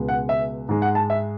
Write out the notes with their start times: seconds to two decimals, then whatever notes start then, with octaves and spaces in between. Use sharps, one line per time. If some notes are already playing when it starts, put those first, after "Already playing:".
Already playing: C#2 B2 G#3
0.09 F#5
0.29 E5
0.69 G#2 G#3
0.82 F#5
0.95 A5
1.10 E5